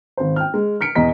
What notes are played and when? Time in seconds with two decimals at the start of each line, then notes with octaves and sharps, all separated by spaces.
0.17 G#1 C5
0.36 G5 F6
0.54 G#3
0.81 F6 B6 C#7 D7
0.95 E2 B2 D#5 A#5 B6